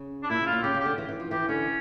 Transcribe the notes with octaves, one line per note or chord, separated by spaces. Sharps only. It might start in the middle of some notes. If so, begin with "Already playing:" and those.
Already playing: C#3
D4
A#2 E4
C#3
F4
A#2
C#3 G4
C#3
G4
D3
E3
E3
F3
E3 G4
D3 C#4